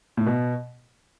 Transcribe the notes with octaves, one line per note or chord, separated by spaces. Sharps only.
A2
B2